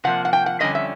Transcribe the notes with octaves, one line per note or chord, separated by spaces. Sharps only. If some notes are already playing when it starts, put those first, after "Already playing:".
C3 F3 A#3 F#5
F#5
G5
F#5
F2 D3 G3 C#4 D#5
E5